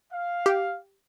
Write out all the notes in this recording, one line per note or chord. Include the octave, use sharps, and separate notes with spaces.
F5
G4